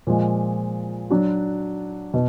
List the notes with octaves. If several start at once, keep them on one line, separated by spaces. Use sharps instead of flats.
A#2 F3 G#3
F#3 D4 F#4
B2